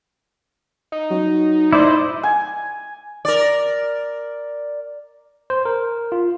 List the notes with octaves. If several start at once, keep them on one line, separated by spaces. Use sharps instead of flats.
D#4
F#3
A2 E4 C5 D5 D#5
G#5
A#4 D5
C5
A#4
F4